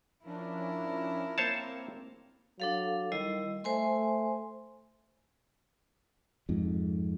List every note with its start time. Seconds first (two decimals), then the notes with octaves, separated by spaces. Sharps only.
0.25 F3 C#4 D4 E4 A#4
1.38 A#3 C4 C5 C#5 A5
2.60 F#3 D4 A4 F5
3.12 D#3 G3 E4 D#5
3.64 A3 C5 G#5 C6
6.49 F2 G#2